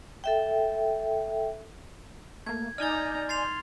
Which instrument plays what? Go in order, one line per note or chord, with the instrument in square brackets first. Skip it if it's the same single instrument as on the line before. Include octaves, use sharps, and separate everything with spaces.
[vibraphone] A4 E5 G5
[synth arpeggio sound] A3 A#3 [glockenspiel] G#6
[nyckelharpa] D#4 A#5 [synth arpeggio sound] D5 G#5 G6 [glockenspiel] F6 A6
[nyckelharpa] C6 [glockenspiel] A6 C7 F7